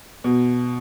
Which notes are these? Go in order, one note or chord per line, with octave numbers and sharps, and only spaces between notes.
B2